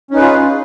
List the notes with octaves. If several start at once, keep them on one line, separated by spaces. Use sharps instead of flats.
C#4 D#4 F4 G#4 B4